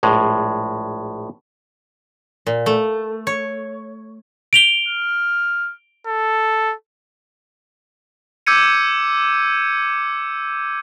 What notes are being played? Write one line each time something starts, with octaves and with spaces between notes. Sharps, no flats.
A#1 A2 G#3
A#2
A3
C#5
D7 F7 G7
F6
A4
D6 E6 G6 G#6 C#7 D#7